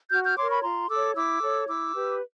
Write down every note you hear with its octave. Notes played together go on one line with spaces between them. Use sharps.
F#4 F6 G6
F6 G6
A#4 C#5 C6 D6
B5 C#6
F4 A#5 C6
A4 C#5 D6 E6
E4 D6 E6
A4 C#5
E4 D6 E6
G4 B4